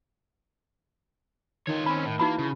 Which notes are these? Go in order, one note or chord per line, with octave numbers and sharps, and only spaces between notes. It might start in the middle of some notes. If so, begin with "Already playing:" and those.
D#3 F4 C#5
C4 C#4 B5
A2
E3 A#3 D#4 F#4 B5
C#3